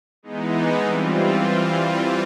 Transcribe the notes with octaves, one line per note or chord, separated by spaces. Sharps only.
E3 G#3 B3 D#4
E3 G3 C4 F4